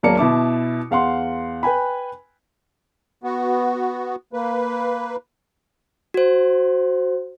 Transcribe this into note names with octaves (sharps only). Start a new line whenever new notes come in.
E1 F#3 A#3 D5 A5 C#7
B2 E4 A5 D6
E2 F5 F#5 C6
B4 G5 G#5 B5
B3 F#4
A#3 B4
F#4 C5